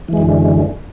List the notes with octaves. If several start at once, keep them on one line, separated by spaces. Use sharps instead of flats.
F#2 D3 E3 G#3